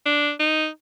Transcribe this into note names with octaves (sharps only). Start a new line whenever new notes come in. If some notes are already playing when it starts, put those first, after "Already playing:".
D4
D#4